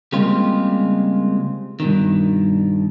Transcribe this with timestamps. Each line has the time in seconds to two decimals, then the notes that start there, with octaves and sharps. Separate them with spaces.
0.12 C#3 G3 G#3 A#3 C4 F4
1.80 G2 B2 D#3